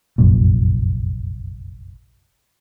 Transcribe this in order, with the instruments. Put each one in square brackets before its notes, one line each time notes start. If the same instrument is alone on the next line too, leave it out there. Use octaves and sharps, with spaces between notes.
[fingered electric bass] F1 A#1 F#2 A#2